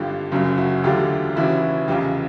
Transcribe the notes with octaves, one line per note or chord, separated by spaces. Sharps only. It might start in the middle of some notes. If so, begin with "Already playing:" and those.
Already playing: G#1 G2 D3 F4 G4
F#1 F#2 C#3 F#3
E4 F#4
E1 D2 D3 F#3 A3 F4 G4
E1 D#2 C#3 E3 E4 F#4
F1 E2 C#3 F4 G4